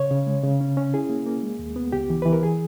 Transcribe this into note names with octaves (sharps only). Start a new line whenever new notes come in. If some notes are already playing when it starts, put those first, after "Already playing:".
Already playing: C#3 C#5
C#3
G#3
C#3
C#4
C#4
E4 G#4
A#3
A#3
G#3
D#2
B3
C#2 G4
E3
E3 B4
A#4
G#4